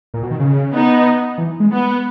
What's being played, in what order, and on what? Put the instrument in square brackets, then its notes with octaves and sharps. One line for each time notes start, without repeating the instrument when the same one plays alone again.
[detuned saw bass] A#2
B2
D#3
C#3
[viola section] B3 D#4
[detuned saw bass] E3
G#3
[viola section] B3